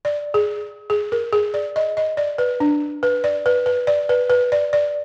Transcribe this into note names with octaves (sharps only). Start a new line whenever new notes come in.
D5
G#4
G#4
A#4
G#4
D5
D#5
D#5
D5
B4
D4
B4
D5
B4
B4
D5
B4
B4
D5
D5